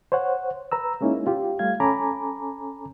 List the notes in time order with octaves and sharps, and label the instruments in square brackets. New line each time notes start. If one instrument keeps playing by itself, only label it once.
[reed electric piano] C5 C#5 F#5
B4 A#5 E6
G#3 A#3 C#4 D#4 E4
F4 G4
G3 A3 F5 G#6
C#4 A4 G#5 A#5 B5 D6